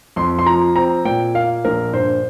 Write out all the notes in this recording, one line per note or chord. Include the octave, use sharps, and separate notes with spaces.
F2 C6
C6
F3 A#5
C4 A#5
A#2 G5
A#3 F5
A#1 A#4
G2 C5